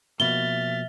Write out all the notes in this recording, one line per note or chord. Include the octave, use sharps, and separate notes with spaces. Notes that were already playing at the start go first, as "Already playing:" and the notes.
B2 F3 A#3 E5 F6 A6 G7